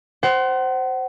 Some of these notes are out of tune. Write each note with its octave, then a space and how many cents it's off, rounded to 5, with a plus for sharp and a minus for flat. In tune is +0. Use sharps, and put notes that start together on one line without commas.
C5 +0 F#5 +35